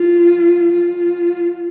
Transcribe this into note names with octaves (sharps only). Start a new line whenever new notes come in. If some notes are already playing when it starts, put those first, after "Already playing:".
Already playing: F4
F4